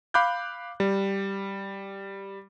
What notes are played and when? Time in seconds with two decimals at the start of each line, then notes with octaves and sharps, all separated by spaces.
0.14 F5 B5 D6 F#6 G6
0.80 G3